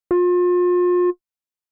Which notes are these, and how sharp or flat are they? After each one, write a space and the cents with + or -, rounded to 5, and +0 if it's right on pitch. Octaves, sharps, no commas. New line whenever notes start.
F4 +35